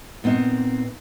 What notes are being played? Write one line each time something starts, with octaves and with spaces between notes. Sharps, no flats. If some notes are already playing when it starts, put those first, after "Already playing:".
A#2 B3 C4 D#4